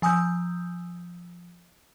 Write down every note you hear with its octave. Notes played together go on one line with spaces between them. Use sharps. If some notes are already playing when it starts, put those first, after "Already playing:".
F3 G#5 D#6 E6 G6